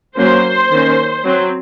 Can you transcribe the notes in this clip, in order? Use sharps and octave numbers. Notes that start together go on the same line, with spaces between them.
F#3 A#3 C#4 C5
D#3 A#3 C#4
F#3 C4